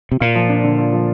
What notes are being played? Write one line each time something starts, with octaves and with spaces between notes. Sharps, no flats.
C3
A#2 F4
F3
D4
D3
F4
F3